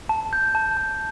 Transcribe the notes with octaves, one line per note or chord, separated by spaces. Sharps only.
A5
G6
A5
A5